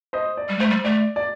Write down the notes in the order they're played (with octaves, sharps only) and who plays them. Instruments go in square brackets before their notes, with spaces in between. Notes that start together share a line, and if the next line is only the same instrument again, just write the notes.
[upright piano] C5 D#5
D5
[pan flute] G3
[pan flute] A3 [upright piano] C5
[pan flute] G3
[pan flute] A3 [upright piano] D5
[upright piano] D5